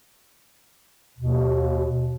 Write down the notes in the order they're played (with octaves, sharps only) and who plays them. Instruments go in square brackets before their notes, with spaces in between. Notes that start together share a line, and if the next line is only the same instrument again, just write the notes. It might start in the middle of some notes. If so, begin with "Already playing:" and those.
[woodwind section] D#2 B2